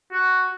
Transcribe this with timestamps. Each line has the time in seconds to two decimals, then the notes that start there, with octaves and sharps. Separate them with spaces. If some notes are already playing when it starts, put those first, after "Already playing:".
0.13 F#4